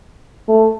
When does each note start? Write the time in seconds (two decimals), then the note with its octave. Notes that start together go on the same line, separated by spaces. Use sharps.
0.48 A3